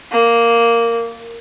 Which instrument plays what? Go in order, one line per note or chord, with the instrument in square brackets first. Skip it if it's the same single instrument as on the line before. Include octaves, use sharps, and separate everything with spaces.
[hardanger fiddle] A#3